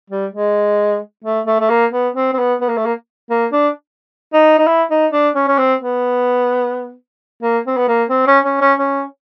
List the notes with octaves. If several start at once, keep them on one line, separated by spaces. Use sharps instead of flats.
G3
G#3
A3
A3
A3
A#3
B3
C4
C4
B3
B3
A#3
A3
A#3
A#3
D4
D#4
D#4
E4
D#4
D4
C#4
C#4
C4
B3
A#3
C4
B3
A#3
C4
C#4
C#4
C#4
C#4